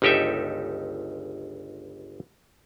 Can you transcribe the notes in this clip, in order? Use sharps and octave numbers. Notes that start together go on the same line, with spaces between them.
G1 C#2 D#4 G4 A4 E5